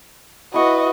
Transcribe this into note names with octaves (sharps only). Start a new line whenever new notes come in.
E4 F#4 B4 D#5 C#6